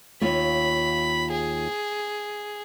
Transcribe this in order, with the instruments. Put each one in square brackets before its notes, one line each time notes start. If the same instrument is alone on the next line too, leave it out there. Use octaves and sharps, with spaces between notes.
[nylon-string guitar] D#2 F4 C#5 [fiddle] B5
[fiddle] G#4